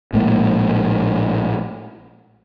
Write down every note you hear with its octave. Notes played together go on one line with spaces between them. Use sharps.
A#1 A2 G#3 A#3